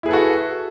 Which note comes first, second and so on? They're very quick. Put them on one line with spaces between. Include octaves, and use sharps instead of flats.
E4 G#4 B4 A4 F#4